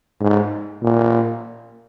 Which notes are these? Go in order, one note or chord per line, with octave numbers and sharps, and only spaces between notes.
G#2
A#2